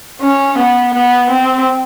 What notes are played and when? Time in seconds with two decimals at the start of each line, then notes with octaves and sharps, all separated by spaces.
0.21 C#4
0.58 B3
0.93 B3
1.29 C4